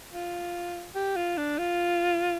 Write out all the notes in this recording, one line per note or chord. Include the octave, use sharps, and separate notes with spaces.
F4
G4
F4
D4
F4